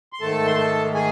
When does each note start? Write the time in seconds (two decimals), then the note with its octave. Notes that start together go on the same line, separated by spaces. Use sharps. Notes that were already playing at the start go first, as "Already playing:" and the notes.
0.13 C6
0.21 G#2 D#3 A3 A4 A5
0.46 C6
0.57 A4 A5
0.94 G#4 G#5